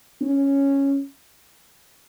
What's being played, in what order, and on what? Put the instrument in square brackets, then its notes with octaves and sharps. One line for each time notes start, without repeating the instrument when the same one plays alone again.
[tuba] C#4